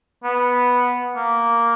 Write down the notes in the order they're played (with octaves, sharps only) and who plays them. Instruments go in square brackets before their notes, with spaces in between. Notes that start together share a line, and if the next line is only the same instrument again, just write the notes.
[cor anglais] B3
A#3